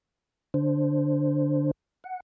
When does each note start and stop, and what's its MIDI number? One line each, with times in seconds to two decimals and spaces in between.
0.54 1.71 50
0.54 1.71 62
0.54 1.71 72
2.04 2.20 78